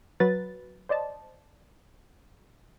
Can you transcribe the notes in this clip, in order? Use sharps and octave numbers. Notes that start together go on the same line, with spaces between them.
F#3 B4 A6
C5 D5 D#5 A5